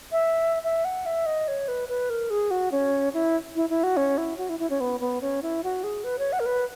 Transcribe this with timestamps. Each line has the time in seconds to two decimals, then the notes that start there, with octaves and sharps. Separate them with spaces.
0.12 E5
0.64 E5
0.85 F#5
1.06 E5
1.26 D#5
1.48 C#5
1.68 B4
1.89 B4
2.10 A#4
2.30 G#4
2.51 F#4
2.72 C#4
3.14 E4
3.56 E4
3.70 E4
3.83 F#4
3.97 C#4
4.18 E4
4.38 F#4
4.49 E4
4.59 E4
4.70 C#4
4.81 B3
5.00 B3
5.21 C#4
5.42 E4
5.64 F#4
5.84 G#4
6.04 B4
6.19 C#5
6.33 F#5
6.40 A#4
6.46 B4